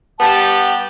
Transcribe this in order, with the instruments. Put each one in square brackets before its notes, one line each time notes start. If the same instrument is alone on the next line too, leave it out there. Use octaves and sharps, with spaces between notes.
[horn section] G3 B3 G4 [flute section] A5